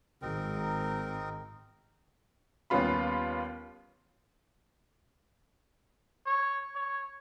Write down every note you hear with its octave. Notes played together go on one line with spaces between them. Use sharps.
G#1 G#2 C4 D#4 A#4
D#2 G3 B3 C#4 F4 B5
C#5
C#5